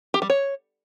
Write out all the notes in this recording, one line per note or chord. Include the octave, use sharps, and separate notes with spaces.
G4
G3
C#5